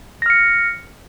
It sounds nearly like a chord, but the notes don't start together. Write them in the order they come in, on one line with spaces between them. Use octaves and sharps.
A#6 F6 C#7